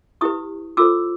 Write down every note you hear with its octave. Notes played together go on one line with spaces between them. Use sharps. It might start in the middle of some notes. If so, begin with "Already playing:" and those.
E4 G4 B4 C#6 D#6
F4 A4 C5 D6 E6